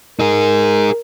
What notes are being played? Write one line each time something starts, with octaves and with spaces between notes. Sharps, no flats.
D#4 G#4 A#4